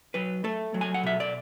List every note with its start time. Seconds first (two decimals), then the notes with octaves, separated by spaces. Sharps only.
0.14 F#3 B4
0.44 A3 A4
0.74 F#3
0.81 G#5
0.94 F#5
1.03 B2 E5
1.20 D5